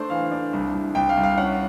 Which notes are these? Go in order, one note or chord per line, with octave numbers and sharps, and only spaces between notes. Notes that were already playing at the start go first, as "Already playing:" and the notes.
Already playing: A3 D4 C5
E3 F5
D4
C2
C2
C2 G5
F5
C2
F5
C#4 F#5